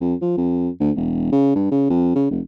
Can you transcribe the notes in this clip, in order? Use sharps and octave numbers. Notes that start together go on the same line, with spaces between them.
F2
F3
F2
D2
E1
C#3
G2
C#3
F2
C#3
F1